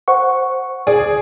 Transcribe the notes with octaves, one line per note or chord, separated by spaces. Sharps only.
C5 F#5 C#6
G#4 D5
D2